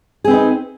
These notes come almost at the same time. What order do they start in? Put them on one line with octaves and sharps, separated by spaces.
G#4 C4 B4 D#4